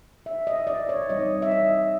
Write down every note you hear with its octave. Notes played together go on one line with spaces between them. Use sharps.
E5
D#5
D5
C#5
E3 G3 C4 D#4 D#5
E5
D#5